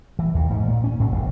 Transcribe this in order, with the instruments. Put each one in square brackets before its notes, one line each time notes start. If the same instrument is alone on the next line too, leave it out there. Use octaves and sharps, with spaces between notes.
[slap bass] E3
D#2
G#2
A#2
C#4
G#2
E1